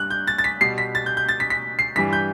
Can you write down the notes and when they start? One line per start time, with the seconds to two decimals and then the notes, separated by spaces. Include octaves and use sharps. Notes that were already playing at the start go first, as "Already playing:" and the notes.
Already playing: G2 G3 F#6
0.10 G6
0.27 A6
0.38 A6
0.44 B6
0.61 B2 G3 C7
0.78 B6
0.95 A6
1.06 G6
1.17 G6
1.29 A6
1.40 B6
1.50 B6
1.79 C7
1.96 G2 E3 G3 B6
2.13 G6